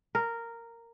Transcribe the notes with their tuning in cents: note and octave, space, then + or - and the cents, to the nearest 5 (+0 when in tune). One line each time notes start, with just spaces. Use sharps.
A#4 -10